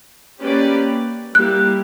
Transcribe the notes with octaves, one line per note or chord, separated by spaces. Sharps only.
A#3 C#4 G4 B4 D5
G3 A#3 E4 G4 F#6